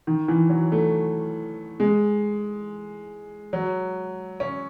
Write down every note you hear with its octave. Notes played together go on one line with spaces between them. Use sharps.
D#3
E3
F#3
A3
G#3
F#3
C#4